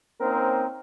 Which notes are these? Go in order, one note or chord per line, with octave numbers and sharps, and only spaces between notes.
A#3 C4 C#4 D#4 A#4 C5